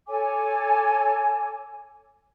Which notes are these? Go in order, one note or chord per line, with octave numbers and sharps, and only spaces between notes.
A4 C#5 G#5 D6